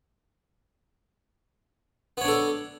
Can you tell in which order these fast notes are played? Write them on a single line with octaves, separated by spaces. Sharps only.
B3 C#5 D4 A4